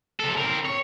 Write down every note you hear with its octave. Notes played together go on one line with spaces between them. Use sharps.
C3 A4
C4 A#4
C#5